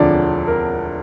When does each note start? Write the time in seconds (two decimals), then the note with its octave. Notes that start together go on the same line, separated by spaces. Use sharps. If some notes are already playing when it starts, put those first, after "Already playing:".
Already playing: E1 D2 D3 F3 D5
0.48 A#4